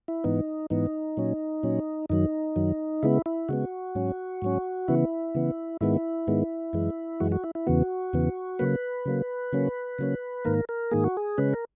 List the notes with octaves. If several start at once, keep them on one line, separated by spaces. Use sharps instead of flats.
E4
G#2 E3 B3 D#4
G#2 E3 B3 D#4
A#2 F#3 C#4
A#2 F#3 C#4
F#2 D#3 F#3 D#4
F#2 D#3 F#3
C#3 G#3 B3 E4
E4
C#3 G#3 B3 F#4
G#2 F#3 C#4
G#2 F#3 C#4
C#3 E3 B3 E4
C#3 E3 B3
G#2 D#3 G#3 B3 E4
G#2 D#3 G#3 B3
F#2 E3 G#3
F#2 E3 G#3 F#4
F#4
E4
E4
E2 C#3 E3 B3 F#4
E2 C#3 E3 B3
C#3 F#3 A#3 B4
C#3 F#3 A#3
C#3 F#3 A#3 C#4
C#3 F#3 A#3 C#4
G#2 D#3 A#3 A#4
A#4
G#2 D#3 A#3 G#4
F#4
G#4
C#3 G#3 C#4 B4
A#4